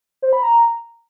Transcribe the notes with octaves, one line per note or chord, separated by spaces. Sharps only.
C5
B5
A#5